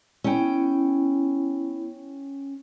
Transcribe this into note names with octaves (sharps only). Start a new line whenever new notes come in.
B3 C#4 E4 G5